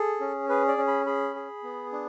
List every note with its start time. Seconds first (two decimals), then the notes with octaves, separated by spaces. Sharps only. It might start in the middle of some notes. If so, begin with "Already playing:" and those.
Already playing: G#4 A4
0.21 C#4
0.49 G#4 B4
0.68 D5
0.78 C#4
0.87 B5
1.06 G#4 B5
1.35 G#4
1.64 B3
1.92 D4